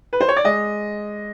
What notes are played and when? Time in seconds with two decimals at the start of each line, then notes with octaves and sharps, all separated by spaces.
0.13 B4
0.20 C5
0.28 C#5
0.36 D5
0.44 G#3 D#5